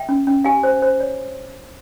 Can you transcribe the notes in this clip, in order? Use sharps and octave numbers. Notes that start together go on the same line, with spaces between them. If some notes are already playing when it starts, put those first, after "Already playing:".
Already playing: E5 G5
C#4
C#4
G4 F5 G#5
C5
C5
C#5